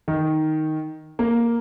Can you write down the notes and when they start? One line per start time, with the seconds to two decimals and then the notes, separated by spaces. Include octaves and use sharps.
0.08 D#3
1.19 A#3